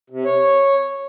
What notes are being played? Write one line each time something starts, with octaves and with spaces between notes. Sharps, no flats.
C3
C#5